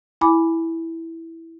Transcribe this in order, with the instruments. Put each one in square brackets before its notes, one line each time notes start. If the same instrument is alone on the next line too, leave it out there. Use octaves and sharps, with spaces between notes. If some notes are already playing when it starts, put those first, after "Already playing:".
[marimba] E4 G#5 B5 D6